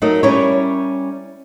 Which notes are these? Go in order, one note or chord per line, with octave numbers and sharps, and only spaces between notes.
F#3 A3 D#4 A#4 D#5
G3 C#4 E4 A#4 C#5